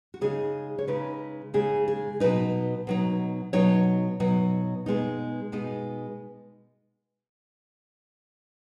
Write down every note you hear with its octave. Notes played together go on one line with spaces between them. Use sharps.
F#4
C#3 G#3 D#4 G#4
C#5
C#3 G#3 D#4 B4
C#3 G#3 D#4 G#4
G#4
B2 F#3 D#4 B4
B2 F#3 D#4
B2 F#3 D#4 C#5
B2 F#3 D#4
B2 G#3 B3 D#4
B2 G#3 B3 D#4